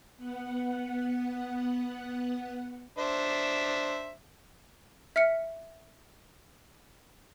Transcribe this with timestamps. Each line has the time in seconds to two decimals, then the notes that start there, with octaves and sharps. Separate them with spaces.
0.17 B3 F#5
2.98 D4 C5 E5
5.16 E5 F6 B6 C#7